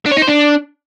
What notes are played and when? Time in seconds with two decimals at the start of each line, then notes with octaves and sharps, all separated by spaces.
0.06 D4
0.11 C#5
0.16 D#4
0.22 C5
0.27 D4